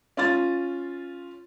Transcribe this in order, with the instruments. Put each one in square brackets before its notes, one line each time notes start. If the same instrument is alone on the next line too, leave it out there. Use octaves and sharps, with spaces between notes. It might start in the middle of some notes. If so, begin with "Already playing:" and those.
[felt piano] C#4 F4 A6